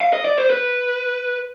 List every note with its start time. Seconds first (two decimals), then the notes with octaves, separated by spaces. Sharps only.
0.01 F5
0.13 D#5
0.25 D5
0.37 C5
0.50 B4